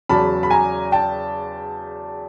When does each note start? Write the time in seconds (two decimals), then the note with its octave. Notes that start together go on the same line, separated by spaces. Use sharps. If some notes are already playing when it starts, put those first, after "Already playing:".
0.09 E2 C#3 F#3 A5 B5
0.43 B5
0.50 G#5 A#5
0.92 G5 A5